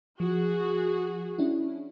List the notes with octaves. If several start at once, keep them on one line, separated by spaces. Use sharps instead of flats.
F3 F#4 G#4
C#4 D4 E4